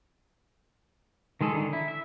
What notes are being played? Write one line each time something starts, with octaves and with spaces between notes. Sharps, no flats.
D#3 G#3 G#4 A4
D3 D#3
E4
E5